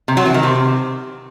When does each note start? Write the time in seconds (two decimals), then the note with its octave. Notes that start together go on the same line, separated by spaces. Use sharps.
0.08 C3
0.17 F#3
0.26 E3
0.34 D#3
0.43 C3